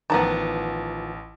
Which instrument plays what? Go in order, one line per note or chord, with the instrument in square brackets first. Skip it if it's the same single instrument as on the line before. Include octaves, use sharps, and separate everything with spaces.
[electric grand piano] A1 A5 [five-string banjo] D#3 F3 B3